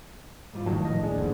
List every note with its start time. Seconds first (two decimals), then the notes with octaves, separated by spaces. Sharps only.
0.53 G#2 G3 F4
0.66 F1 A2 D#3 F#3 A5
0.85 A#1 D#5
1.03 D#2 D4 G#4
1.18 E2 G#2 D3